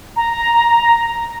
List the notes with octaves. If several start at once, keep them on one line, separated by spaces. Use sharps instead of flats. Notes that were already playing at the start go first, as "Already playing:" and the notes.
A#5